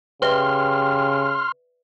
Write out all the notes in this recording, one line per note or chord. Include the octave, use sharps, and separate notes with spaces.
C#3 G4 B4 D5 E5 C6 F6